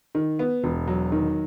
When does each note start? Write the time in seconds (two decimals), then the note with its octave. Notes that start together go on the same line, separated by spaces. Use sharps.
0.15 D#3
0.39 B3
0.64 E1
0.87 F#3
1.12 D#3